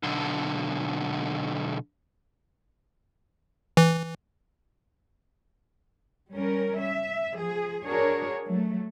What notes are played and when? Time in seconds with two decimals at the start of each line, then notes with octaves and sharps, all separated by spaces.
0.03 B1 D3
3.77 E3
6.32 G3 C#4 A#4
6.79 E5
7.37 F3 G#4
7.85 D4 F#4 G#4 A#4 C#5
8.46 F#3 A3